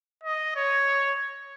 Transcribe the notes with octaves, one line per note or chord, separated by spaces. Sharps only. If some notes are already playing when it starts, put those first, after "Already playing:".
D#5
C#5